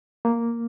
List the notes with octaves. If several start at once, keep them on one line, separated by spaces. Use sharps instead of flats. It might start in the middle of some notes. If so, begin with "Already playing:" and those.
A#3